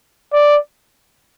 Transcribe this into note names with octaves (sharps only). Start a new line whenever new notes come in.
D5